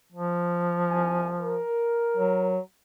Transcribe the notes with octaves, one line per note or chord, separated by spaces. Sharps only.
F3
C2 G#5
A#4
F#3